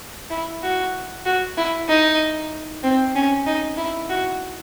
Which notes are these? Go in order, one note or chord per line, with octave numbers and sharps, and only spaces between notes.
E4
F#4
F#4
E4
D#4
C4
C#4
D#4
E4
F#4